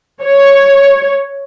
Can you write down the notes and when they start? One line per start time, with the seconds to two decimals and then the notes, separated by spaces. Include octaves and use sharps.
0.22 C#5